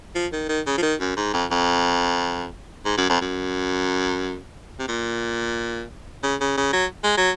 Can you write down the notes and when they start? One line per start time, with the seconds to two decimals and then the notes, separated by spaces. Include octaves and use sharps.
0.15 F3
0.33 D#3
0.49 D#3
0.67 C#3
0.78 F3
0.82 D#3
1.00 F#2
1.17 G#2
1.33 F2
1.51 F2
2.85 G#2
2.98 F#2
3.10 F2
3.22 F#2
4.79 C3
4.88 A#2
6.24 C#3
6.41 C#3
6.57 C#3
6.73 F#3
7.04 G#3
7.18 F#3